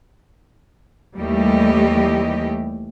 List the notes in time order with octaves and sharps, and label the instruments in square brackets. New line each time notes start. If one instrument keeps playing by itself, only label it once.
[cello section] D#2 E3 G3 A3 G4 D#5